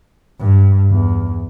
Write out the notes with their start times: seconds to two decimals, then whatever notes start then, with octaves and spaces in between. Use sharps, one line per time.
0.40 G2
0.92 E2